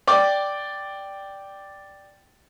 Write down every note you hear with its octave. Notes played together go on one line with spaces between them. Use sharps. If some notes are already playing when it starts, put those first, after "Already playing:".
D5 G5 D6